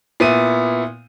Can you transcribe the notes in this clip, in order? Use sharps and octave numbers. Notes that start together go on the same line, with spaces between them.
A#2 B3 E4 D#7